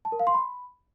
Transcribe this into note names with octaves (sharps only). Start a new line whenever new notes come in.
A5
A#4
F5
C6
B5